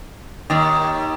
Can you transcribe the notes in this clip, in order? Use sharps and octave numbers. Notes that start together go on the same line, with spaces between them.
D#2 D#3